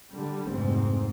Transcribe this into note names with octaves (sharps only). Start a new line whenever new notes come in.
D3 G3
F1 G#2 C4